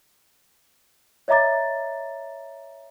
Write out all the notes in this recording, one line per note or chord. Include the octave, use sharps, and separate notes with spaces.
C#5 D#5 E5 A#5 D6 A6